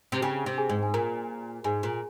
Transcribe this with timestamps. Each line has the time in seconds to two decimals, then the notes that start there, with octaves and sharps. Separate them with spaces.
0.12 C3
0.22 C#3 G4 G5
0.46 C3
0.58 G#4 G#5
0.69 G#2
0.83 G#5
0.94 A#2 A#4 A#5
1.64 G#2 G#4 G#5
1.83 A#2